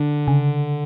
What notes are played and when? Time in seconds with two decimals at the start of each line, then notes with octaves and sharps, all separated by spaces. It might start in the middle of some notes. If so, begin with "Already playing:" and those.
Already playing: D3 D4
0.28 C#3